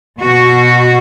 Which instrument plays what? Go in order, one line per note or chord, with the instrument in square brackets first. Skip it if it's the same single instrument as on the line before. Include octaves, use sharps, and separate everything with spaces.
[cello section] B2 F#4